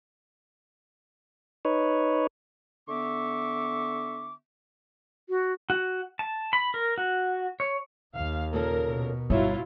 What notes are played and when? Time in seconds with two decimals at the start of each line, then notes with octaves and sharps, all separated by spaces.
1.65 D#4 B4 C#5
2.88 D3 B3 E5 C#6 D6
5.29 F#4
5.70 F#4
6.19 A5
6.53 B5
6.74 A#4
6.98 F#4
7.60 C#5
8.16 D#2 F5
8.53 A#2 C#3 A4 A#4
8.86 B2
9.30 G1 F#3 E4 F4 C#5 D#5 E5